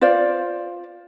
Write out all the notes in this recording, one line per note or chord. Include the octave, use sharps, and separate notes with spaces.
F4 C5 D5 F5